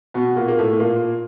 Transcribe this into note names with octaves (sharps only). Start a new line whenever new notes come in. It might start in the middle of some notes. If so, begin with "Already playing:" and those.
B2 B3
A#2 A#3
A#3
A2 A3
A#2 A#3